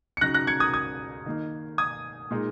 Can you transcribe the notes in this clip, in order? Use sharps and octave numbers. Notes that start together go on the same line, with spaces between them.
C#7
C#3 F#3 D#4 F#6 A#6
F#6 A#6
G#6 C#7
D#6 G#6
D#6 G#6
D#3 A#3 D#4
D#6 G#6
A#2 G#3 D#4